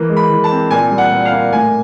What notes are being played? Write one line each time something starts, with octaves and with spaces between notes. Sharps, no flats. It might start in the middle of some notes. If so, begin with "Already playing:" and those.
Already playing: E3 A#3
G#3
B5
E3
A5
C4
A#2 G#5
G3
F#5
A#2
F5
A#3
A2 G#5